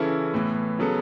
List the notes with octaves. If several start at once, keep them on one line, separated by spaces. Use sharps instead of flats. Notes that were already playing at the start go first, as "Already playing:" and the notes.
Already playing: C#3 E3 C#4 E4 A4
A2 E3 B3
C#3 F#3 B3 A4